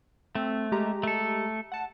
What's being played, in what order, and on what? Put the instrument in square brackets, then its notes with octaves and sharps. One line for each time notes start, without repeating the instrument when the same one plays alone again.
[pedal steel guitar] A3 [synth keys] C4
[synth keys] G#3 G4 A#5
[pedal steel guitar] A3 A4
[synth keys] F#5 A5